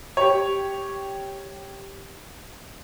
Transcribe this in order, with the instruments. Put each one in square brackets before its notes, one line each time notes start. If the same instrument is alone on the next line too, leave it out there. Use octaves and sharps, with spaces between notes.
[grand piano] G4 C#5